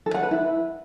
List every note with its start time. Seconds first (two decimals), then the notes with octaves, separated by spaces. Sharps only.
0.06 A4
0.14 F#5
0.23 B4
0.31 E4